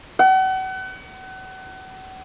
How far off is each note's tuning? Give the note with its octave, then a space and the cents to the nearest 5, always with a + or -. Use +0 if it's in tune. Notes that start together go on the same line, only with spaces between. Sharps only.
F#5 +35